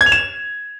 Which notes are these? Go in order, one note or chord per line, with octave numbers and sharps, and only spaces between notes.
G#6
F7
E7